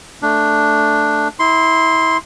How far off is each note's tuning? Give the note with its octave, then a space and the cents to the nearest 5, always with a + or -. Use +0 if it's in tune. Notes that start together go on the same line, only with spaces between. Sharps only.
A3 +0 D4 +0
E4 -30 C6 +0